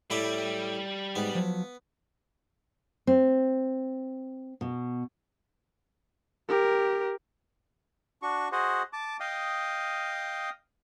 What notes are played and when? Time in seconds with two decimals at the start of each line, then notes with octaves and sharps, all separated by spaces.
0.10 A2 G3 E4 D5
1.16 G#2 B3 G#4 G#5
1.35 F3 F#3
3.07 C4
4.61 B2
6.48 G4 A#4
8.22 D4 F#4 C#6
8.52 F#4 G#4 C5 D#5 F#5
8.93 A5 D6
9.20 D#5 F5 G5 D#6